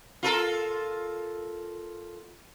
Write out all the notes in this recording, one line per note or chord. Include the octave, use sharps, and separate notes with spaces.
F4 A4 A#4